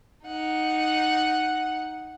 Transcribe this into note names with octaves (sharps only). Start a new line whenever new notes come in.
D#4 F#5